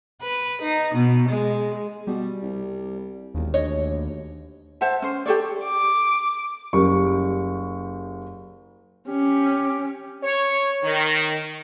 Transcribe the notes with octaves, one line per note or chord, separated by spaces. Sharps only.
B4
D#4
B2
G#3
B2 G3
C2
E1 D#2
D2 C#5 D#5
C5 E5 F#5 A5
C#4 C5
G4 A4 C#5 D5
D6
F#1 G3 C#6
C#4 G4
C#5
D#3